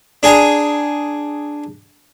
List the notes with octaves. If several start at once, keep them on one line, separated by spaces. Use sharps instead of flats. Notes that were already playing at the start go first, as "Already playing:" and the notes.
D4 G#4 G#5 A#5